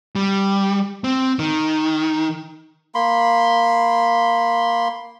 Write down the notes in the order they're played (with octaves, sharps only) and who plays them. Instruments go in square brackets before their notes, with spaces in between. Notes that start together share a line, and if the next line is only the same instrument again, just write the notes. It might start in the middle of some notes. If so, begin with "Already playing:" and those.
[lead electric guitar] G3
C4
D#3
[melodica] A#3 B5 C6